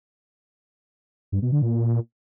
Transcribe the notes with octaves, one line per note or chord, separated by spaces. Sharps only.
G2
B2
D3
A#2